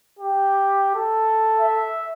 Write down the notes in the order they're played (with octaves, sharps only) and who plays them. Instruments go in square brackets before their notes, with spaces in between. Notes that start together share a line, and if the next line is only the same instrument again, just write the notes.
[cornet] G4
A4
[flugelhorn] E5